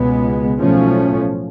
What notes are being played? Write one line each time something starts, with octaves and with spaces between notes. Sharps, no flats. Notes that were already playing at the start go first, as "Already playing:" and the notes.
Already playing: C#2 B2 G#3 B3
B1 A2 F3 A3 C#4